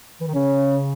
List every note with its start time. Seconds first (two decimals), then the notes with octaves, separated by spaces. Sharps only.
0.21 E3
0.28 D#3
0.35 C#3 C#4